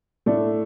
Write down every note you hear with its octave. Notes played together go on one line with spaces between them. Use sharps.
A2 A3 D4 A4